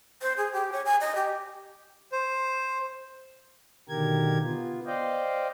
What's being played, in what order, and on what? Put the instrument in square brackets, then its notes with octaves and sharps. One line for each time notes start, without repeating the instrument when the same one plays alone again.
[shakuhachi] C5
G#4
G4
C#5
G#5
D#5
G4
[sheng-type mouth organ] C5
[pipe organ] B2 D3 D#3 G4 A#4 G#6
B3 F4
C5 D5 D#5 F5 G5